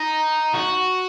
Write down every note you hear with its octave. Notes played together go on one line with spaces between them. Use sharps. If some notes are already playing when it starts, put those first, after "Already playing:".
Already playing: D#4
F#4